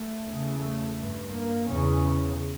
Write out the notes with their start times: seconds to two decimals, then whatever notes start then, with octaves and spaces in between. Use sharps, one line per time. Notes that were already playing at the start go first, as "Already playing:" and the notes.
Already playing: A3
0.22 E2 C#3
0.59 A3
0.95 G2
1.32 A#3
1.69 E2 C#3 C#4